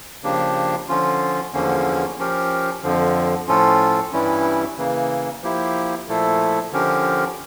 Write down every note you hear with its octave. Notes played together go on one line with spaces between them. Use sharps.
C#3 F3 A#3 D4 G4
D3 F3 C#4 F4
E2 D3 F3 A#3 C#4
F3 C#4 G4 A#4
F2 D3 F3
A2 F3 C#4 F4 A4
G2 E3 G3 C#4 E4
C#3 E3 A#3
F3 A#3 E4 G4
A#2 F3 A3 E4 A4
D3 F3 C#4 G4 A#4